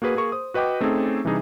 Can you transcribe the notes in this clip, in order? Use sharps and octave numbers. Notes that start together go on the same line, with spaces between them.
A#3 F#4 G#4 B4
A#3 G#4 A#4 C#6
C5 D#6
F#4 B4 D#5 G5 D6
A3 C4 C#4 D#4 G#4 A4
C3 E3 G3 D4 D#4 G#4